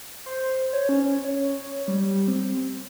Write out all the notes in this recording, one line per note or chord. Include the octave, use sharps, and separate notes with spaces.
C5
C#5
C#4
C#5
G3
C4